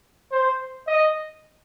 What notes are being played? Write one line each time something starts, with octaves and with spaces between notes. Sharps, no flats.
C5
D#5